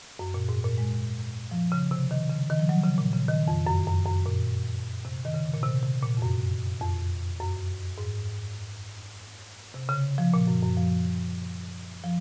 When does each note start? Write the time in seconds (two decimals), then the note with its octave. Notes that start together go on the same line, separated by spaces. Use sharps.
0.19 F#2
0.34 A#2
0.49 G#2
0.64 A#2
0.78 G#3
1.51 F3
1.72 C#3
1.91 C3
2.11 D#3
2.29 C#3
2.50 D#3
2.59 F3
2.69 F#3
2.84 C#3
2.98 A#2
3.13 C#3
3.28 D#3
3.48 F2
3.67 F#2
3.87 F#2
4.06 F#2
4.25 A#2
5.05 C3
5.25 D#3
5.34 C#3
5.54 A#2
5.63 C3
5.83 C3
6.02 A#2
6.17 F2
6.22 F#2
6.81 F2
7.40 F#2
7.98 G#2
9.74 C3
9.89 C#3
10.18 F3
10.34 A#2
10.47 F#2
10.63 F#2
10.77 F3
12.04 F3